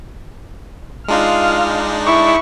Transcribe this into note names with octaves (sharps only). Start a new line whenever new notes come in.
G#3 D4 D#4 F4 F6
E4 C#6